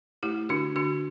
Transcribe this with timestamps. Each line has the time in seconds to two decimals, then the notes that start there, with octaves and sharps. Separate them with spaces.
0.23 A3 E4 G4
0.49 D3 D4 F#4
0.76 D3 D4 F#4